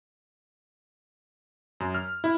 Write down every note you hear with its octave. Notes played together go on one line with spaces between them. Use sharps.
F#2
F6
E4